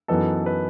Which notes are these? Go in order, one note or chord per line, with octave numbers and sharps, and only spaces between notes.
F#2 E3 B3 D#4 A4
B4